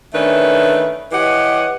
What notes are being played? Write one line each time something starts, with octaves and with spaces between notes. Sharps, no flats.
D#3 A3 C#4 D4 B4
E3 G4 C#5 D#5 F#5